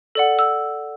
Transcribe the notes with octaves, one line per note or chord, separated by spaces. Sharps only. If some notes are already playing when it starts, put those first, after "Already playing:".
A4 D5 F#5
E6